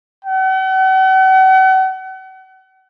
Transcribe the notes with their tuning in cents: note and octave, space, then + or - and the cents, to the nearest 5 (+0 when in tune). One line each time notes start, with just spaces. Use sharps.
F#5 +40